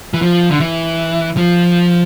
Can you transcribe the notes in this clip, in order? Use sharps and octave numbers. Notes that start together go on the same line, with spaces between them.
E3
F3
D3
E3
F3